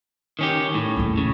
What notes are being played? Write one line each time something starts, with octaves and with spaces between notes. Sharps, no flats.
D#3 C#4 G4
A2
E2 A#2
C#3